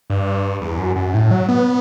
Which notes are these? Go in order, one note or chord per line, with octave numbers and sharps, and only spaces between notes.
G2
E2
F#2
F#2
A2
F#3
B3